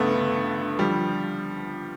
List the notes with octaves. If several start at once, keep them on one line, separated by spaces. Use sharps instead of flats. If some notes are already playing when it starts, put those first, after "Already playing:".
Already playing: C#2 G2 A3 B3
D3
D3
D3
D3 F3 G3